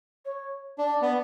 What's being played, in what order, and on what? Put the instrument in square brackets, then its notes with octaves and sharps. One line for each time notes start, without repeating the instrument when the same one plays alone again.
[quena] C#5
[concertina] D4 [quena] D5
[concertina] B3